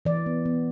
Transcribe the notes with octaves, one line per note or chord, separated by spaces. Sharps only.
E3 D5
B3
B3